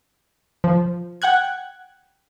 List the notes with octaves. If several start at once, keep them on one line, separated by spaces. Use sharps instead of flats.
F3
F#5 G5 F#6 G#6